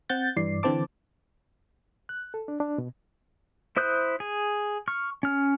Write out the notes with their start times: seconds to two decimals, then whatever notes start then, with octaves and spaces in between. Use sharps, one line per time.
0.09 C4 F#5 G6 A6
0.36 G2 E3 D5 C7
0.63 D3 E3 C4 C5 A5 D6
2.09 F#6
2.34 A4
2.48 D4
2.60 D4
2.78 B2
3.76 E4 C5 D#6 F#6 G6
4.20 G#4
4.88 C#6 F6
5.23 C#4 F6